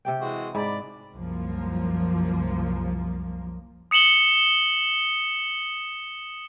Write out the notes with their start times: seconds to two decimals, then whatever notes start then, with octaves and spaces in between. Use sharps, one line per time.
0.05 C3 G4 G5
0.21 E3 G#3 F#4
0.55 G#2 D5 B5
1.11 C2 F#2 F3 A#3
3.91 D#6 C#7 E7 F#7 G7